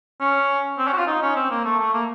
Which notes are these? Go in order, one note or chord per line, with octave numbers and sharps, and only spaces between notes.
C#4
C4
C#4
F#4
F4
D#4
C#4
C4
A#3
A3
A3
A#3